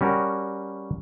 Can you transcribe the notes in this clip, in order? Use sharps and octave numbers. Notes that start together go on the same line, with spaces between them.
G3 C#4 F#4 A#4